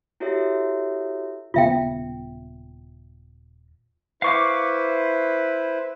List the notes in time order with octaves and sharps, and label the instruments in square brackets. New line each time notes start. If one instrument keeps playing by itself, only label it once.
[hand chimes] E4 F#4 G4 A4 C#5 E5
[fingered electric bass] D#1 C#3 B3 [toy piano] F4 E5 G5
[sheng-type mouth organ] E4 B4 C5 [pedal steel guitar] F5 C#6 D6